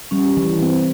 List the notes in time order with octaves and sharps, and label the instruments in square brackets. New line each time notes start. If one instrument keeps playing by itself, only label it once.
[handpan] G3 [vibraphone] C#4
[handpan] E3
C4